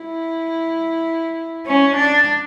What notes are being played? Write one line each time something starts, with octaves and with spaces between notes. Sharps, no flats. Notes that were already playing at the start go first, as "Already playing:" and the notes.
Already playing: E4
C#4
D4